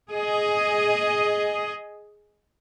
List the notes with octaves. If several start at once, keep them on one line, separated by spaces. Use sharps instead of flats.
G#4 D#5